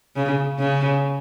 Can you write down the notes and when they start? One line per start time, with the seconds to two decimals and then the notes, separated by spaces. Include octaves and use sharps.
0.16 C#3
0.59 C#3